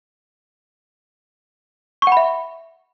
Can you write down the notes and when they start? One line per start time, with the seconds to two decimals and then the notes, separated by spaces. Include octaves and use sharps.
2.02 C#6
2.07 F#5
2.12 B5
2.17 E5